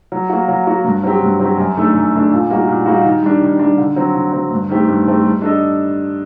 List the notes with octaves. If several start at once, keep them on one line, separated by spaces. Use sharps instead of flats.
F#3
A#3 F#4
F#3
A#3 F#4
G2
F#3 C4 G4
G2
F#3 C4 G4
F#2
D#3 A3 D4 A4
F#2
D#3 A3 D4 A4
A#2
G3 A#3 D#4 F#4
A#2
G3 A#3 D#4 F#4
D#3
G3 D4
D#3
G3 D4
D3
F#3 C4
D3
F#3 C4
G2
D#3 A3 C4 G4
G2
D#3 A3 C4 G4
G3
D4 A4 D#5